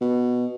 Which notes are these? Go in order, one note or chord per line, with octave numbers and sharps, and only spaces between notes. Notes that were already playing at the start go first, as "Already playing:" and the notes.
B2